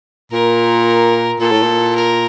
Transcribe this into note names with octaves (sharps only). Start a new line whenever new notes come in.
A#2 A#4
A#2 A4
A2
A#2
A#4